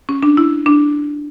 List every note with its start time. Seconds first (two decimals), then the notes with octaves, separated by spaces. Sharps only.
0.09 C#4
0.23 D4
0.37 E4
0.66 D4